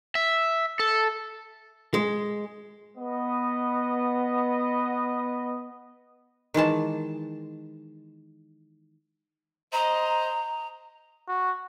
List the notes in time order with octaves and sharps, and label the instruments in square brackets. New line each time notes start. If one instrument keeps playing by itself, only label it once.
[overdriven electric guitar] E5
A4
[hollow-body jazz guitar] G#3
[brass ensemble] B3 D#5
[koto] D#3 E3 G#3 A5
[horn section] C5 D#5 [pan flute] A#5
[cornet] F#4